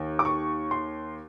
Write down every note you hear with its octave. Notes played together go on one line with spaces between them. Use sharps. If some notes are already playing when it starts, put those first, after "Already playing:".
Already playing: D#2
D6
C#6
C6